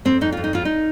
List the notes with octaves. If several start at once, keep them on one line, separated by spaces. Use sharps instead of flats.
F2 C4
F2 D#4
F2 F4
D#4
F2 F4
D#4